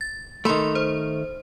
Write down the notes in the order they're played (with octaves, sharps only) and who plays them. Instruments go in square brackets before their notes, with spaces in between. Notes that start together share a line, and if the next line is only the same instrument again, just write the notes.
[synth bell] A6
[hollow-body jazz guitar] D#3 A3 [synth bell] B5 C6
[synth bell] C5